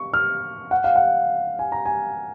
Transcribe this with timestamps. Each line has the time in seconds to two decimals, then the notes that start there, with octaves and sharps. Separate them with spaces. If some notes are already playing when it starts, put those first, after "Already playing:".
Already playing: C#6
0.14 F6
0.71 F#5
0.84 F5
0.96 F#5
1.59 G#5
1.72 A#5
1.86 G#5